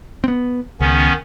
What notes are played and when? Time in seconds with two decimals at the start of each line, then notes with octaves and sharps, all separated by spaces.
0.24 B3 C4
0.81 C#2 D#3 B3 C#4